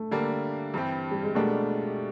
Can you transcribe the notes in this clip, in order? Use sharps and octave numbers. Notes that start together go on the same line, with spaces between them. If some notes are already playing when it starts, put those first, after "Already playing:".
Already playing: A3
D3 G3 A#3 D4
G2 E3 G3 C4
G3
G#3
B2 G3 A3 A#3 D4 G4